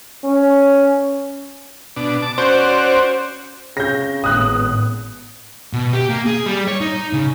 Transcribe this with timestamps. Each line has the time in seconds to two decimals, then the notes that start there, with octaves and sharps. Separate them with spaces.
0.24 C#4
1.96 B2 D4
2.22 A5 D6
2.38 C#4 F#4 C5 D5
3.77 C#3 G6 A#6
4.24 G#1 A2 B3 D#6 F#6
5.73 B2
5.93 G4
6.10 A#3
6.26 G#4
6.46 G3
6.68 C#5
6.81 D#4
7.13 C#3